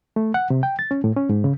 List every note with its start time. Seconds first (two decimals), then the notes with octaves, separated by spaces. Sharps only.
0.16 A3
0.34 F#5
0.50 C3
0.63 G5
0.79 A6
0.91 C#4
1.04 A2
1.16 C#4
1.29 G#2
1.44 C#3